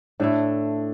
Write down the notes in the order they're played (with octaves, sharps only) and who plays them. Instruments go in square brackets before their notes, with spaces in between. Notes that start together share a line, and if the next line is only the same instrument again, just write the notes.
[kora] A2 A3 E4 [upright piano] D4